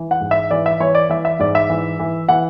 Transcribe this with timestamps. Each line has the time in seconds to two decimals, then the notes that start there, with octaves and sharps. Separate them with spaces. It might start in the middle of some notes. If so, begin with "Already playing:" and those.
Already playing: E3
0.11 F#5
0.21 G#2
0.31 E5
0.51 E3 D5
0.66 E5
0.80 E3 C#5
0.95 D5
1.09 E3 E5
1.25 E5
1.39 G#2 D5
1.55 E5
1.70 E3
1.99 E3
2.29 E3 F#5